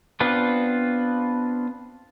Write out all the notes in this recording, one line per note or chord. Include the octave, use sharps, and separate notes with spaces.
B3 C4 D4 F4 B4